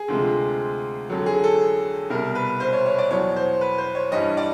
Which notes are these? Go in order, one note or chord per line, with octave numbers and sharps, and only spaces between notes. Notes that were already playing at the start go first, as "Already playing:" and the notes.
Already playing: G#4
D2 C3 F3 G#3
F2 D3 F#3
G#4
A4
C2 B2 G3 A#4
B4
C5
C#5
C#5
D5
E2 B2 F#3 C#5
C5
B4
C5
C#5
G2 E3 G3 D#5
D5